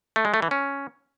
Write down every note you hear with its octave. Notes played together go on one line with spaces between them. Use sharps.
A3
G#3
A3
E3
C#4